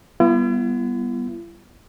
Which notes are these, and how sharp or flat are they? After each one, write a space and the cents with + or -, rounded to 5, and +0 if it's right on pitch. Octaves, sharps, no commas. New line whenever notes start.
G3 +0 B3 -15 E4 +45